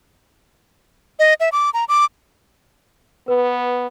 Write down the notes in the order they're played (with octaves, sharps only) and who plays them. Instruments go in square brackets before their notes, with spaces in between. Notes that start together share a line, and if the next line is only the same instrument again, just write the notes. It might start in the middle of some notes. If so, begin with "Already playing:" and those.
[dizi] D#5
E5
D6
A#5
D6
[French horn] B3 [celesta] B4